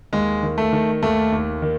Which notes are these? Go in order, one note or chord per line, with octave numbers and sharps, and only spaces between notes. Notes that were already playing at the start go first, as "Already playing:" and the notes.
D#2 G#3
D#3
A3
D#3
D#2 A3
D#2
D#3